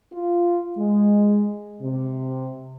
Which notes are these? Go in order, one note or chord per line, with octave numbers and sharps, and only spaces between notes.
F4
G#3
C3